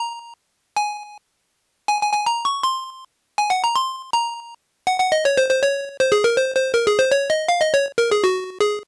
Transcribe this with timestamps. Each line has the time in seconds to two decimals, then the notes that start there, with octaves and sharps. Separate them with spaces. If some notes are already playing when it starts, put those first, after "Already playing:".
Already playing: A#5
0.77 G#5
1.88 G#5
2.01 G#5
2.13 G#5
2.26 A#5
2.45 C#6
2.63 C6
3.38 G#5
3.50 F#5
3.64 A#5
3.76 C6
4.13 A#5
4.87 F#5
5.00 F#5
5.12 D#5
5.25 C#5
5.37 C5
5.50 C5
5.63 C#5
6.00 C5
6.12 G#4
6.24 A#4
6.36 C5
6.55 C5
6.74 A#4
6.87 G#4
6.99 C5
7.12 C#5
7.30 D#5
7.48 F5
7.61 D#5
7.74 C#5
7.98 A#4
8.11 G#4
8.24 F#4
8.60 G#4